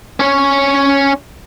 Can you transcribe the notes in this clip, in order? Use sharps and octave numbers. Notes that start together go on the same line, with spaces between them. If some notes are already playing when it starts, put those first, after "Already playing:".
C#4 C#5